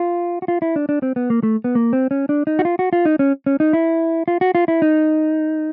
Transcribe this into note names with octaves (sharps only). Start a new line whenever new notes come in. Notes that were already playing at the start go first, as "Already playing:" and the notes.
Already playing: F4
F#4
F4
E4
D4
D4
C4
B3
A#3
A3
B3
A#3
C4
C#4
D4
D#4
F#4
F4
F#4
F4
D#4
C#4
C#4
D#4
E4
F4
F#4
F4
E4
D#4